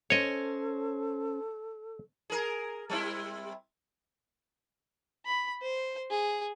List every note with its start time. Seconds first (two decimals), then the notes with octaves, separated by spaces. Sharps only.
0.10 C#4 A4 C5 C#5 D#5
2.30 G#4 A#4
2.90 G3 C4 E4
5.26 B5
5.62 C5
6.10 G#4